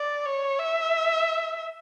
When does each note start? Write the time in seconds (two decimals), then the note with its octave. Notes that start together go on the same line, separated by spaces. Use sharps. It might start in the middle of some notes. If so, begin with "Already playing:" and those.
Already playing: D5
0.26 C#5
0.59 E5